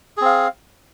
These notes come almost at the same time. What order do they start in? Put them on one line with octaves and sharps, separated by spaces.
G#4 C4 F5